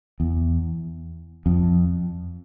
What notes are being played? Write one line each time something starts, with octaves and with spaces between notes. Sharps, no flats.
E2
F2